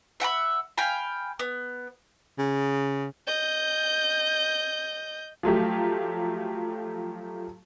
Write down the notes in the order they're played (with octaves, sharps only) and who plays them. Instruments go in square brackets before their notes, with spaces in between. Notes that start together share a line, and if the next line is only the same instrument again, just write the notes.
[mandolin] E5 F#5 G5 B5
F5 G5 G#5 B5
B3
[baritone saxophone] C#3
[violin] D#5 G6
[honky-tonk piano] F3 F#3 A3 G4